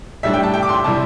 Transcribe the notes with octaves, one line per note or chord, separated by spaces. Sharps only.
A2 G3 D4 E5
G5
A5
G5
D6
C6
C3 G3 E4 A5